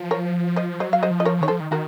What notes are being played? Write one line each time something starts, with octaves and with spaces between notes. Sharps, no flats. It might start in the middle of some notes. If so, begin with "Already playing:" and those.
Already playing: F3
A#4 C#5
C5 D#5
F#3 C5 D#5
F5
C5 D#5
F3
D#5
A#4 C#5
D#3 C#5
F3 A4 C5
D#3
D#3 F#4 A#4